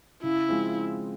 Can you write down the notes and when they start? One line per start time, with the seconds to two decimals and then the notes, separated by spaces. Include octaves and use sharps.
0.23 C#3 E4
0.49 F3 G#3 C4